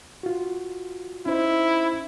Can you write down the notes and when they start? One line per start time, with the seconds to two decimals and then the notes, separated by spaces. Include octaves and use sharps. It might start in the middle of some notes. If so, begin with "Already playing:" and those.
0.23 F4 F#4
1.26 C#4 D#4 E4 C5